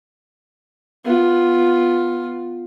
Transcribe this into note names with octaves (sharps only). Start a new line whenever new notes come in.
B3 F4